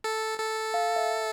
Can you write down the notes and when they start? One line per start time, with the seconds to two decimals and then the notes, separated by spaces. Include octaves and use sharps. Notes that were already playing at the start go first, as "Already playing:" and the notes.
0.04 A4
0.39 A4
0.74 F5
0.96 E5